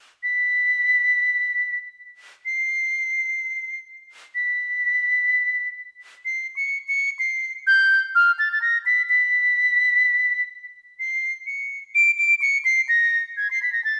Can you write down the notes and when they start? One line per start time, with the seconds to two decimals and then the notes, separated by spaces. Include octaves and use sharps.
0.23 B6
2.46 C7
4.35 B6
6.25 C7
6.56 C#7
6.88 C#7
7.19 C7
7.67 G6
8.15 F6
8.39 A6
8.53 A6
8.62 A#6
8.86 B6
9.09 B6
10.99 C7
11.47 C#7
11.95 D7
12.18 D7
12.42 C#7
12.65 C7
12.89 A#6
13.37 G#6
13.51 C7
13.63 B6
13.73 A#6
13.84 A6